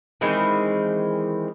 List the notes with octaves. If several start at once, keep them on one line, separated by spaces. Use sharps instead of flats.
D#3 E3 G#3 C4